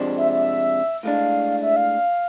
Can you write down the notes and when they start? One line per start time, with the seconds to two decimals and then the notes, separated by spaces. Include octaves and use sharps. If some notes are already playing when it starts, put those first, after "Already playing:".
Already playing: C3 F3 G#3 D4
0.16 E5
0.32 E5
1.03 A2 G#3 D4 F5
1.62 E5
1.76 F5